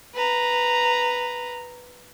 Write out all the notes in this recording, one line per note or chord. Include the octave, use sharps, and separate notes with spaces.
B4 A#5